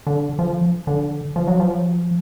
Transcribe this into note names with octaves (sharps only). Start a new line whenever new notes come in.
D3
F3
D3
F3
F#3
F3